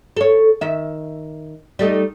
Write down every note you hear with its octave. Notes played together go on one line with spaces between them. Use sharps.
A4 C#5
D#3 E5
G3 A3 D#4